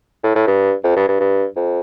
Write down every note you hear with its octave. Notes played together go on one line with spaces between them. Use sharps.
A2
A2
G2
F2
G2
G2
G2
F2